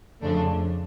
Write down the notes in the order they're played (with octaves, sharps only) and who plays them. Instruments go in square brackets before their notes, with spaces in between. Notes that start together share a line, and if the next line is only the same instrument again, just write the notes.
[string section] F2 C#3 F3 A3 D4